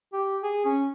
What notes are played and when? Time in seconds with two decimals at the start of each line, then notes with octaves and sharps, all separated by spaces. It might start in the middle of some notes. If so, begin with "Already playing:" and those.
0.13 G4
0.43 G#4
0.65 C#4